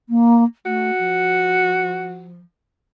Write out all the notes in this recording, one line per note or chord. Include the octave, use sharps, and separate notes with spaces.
A#3
A3 F#4
F3